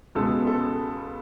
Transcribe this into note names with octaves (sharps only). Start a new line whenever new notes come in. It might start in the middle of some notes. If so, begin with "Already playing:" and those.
C#2 B2 G#3 A4
A4